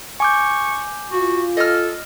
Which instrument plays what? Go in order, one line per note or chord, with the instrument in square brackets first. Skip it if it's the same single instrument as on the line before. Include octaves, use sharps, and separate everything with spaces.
[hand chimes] G#5 D6 G6 [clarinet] C#6
[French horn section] F4 [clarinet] F#4
[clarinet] A4 [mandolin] D#5 F6